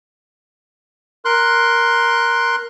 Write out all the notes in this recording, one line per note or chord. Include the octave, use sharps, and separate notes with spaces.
A#4 C6 F#6